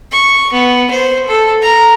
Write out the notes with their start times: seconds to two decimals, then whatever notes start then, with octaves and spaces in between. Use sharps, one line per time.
0.12 C#6
0.53 B3
0.91 C5
1.28 A4
1.62 A#5